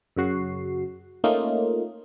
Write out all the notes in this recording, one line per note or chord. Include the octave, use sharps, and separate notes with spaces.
F#2 C#3 F#4 C7
A3 A#3 C#4 D#4 F4